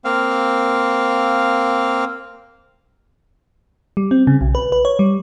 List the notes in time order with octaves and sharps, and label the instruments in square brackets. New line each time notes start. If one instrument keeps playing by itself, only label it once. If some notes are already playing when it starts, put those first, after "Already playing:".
[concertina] A#3 C4 F5
[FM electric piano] G3
C4
C#3
B1
B4
B4
C#5
G3